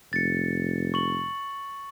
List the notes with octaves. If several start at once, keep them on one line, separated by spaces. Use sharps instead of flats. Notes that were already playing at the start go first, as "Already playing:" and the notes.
F1 A6 C#7
C#6 F#7